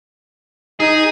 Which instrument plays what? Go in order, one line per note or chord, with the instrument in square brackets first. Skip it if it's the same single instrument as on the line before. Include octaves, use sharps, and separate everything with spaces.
[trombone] D#4 [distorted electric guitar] G#4